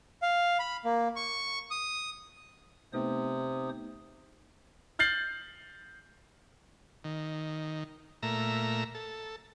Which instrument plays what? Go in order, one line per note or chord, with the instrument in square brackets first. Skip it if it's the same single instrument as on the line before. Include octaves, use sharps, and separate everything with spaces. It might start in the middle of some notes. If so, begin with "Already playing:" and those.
[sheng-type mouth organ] F5
B5
A#3
C#6
D#6
[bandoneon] C3 [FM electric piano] A3 B3 D#4 [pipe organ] C5 D#6
[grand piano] F6 G6 A6 C7 F#7
[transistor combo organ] D#3
A#2 A3 E5 A#5
A4